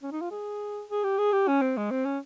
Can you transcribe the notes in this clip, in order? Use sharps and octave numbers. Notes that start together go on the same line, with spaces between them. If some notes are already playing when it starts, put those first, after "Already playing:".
C#4
D#4
F4
G#4
G#4
G4
G#4
G4
C#4
C4
G#3
C4
C#4